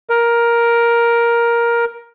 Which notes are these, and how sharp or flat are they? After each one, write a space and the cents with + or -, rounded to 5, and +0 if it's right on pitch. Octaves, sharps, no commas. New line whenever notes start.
A#4 +10